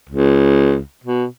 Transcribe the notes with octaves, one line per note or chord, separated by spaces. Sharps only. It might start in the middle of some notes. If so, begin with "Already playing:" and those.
C#2
B2